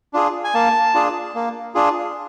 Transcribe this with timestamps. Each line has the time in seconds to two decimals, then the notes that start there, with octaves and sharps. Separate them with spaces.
0.13 D4 F4 G#4
0.44 G#5
0.54 A#3 A5
0.94 D4 F4 G#4
1.35 A#3
1.75 D4 F4 G#4